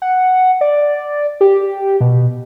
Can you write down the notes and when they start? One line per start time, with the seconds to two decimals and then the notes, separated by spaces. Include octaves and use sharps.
0.02 F#5
0.61 D5
1.41 G4
2.01 B2